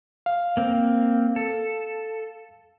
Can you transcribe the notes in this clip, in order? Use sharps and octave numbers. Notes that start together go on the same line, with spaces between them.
F5
A#3 C4
A4